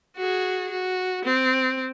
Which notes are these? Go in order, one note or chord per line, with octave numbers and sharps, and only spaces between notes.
F#4 G#4
F#4
C4